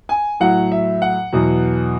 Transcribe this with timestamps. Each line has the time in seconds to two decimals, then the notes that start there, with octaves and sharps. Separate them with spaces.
0.09 G#5
0.40 A2 F#3 F#5
0.72 E5
1.02 F#5
1.32 E2 B2 F#3